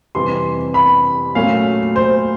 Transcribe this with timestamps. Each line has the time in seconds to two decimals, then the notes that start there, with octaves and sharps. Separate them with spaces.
0.15 F2 C3 E3 G3 C6
0.74 B5
1.35 A#2 F#3 A3 C#4 F5
1.96 C5